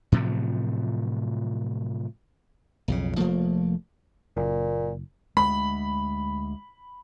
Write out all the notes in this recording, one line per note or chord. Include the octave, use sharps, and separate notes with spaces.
A2 C3 F3 F#3
B1 F2 C#3
F1 F3 A3 A#3
F#1 A#2
D2 G#3 B5